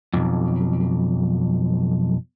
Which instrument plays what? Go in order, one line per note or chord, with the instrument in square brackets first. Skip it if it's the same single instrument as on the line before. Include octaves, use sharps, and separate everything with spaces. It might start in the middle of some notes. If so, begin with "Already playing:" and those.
[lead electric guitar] B1 F2